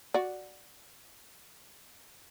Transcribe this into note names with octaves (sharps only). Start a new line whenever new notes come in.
F#4 D5